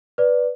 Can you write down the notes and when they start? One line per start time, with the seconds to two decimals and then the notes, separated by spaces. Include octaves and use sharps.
0.18 B4 D5